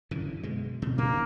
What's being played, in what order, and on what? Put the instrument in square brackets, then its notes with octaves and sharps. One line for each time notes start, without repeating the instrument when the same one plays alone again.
[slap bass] F#2 D3 E3
B2 G#3
B2
[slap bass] A#2 G3 D4 [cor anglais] A#3